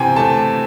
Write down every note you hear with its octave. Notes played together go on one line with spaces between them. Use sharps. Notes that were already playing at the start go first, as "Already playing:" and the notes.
Already playing: C3 E3 G5 G#5
A3 A5